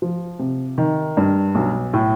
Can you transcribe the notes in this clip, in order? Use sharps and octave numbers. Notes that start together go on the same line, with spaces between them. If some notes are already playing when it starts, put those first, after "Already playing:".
F3
C3
D#3
G2
B1
A2